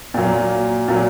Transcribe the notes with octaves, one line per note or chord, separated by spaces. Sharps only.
A#2 F#3 A#3
A#2 F#3 A#3